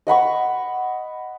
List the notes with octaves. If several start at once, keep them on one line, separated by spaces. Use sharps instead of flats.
D#5 F#5 B5 C#6